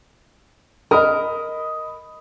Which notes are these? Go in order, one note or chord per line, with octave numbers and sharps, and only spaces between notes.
A#4 D#5 B5 D#6